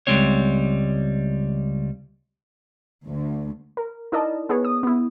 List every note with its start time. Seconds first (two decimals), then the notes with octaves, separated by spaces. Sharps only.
0.07 C#2 G3 G#3 C4 C#5
3.06 D2
3.77 A#4
4.12 D#4 E4 A#4 D5 D#5 A5
4.49 B3 G#4 B4 C#5
4.65 D#6
4.83 B3 E4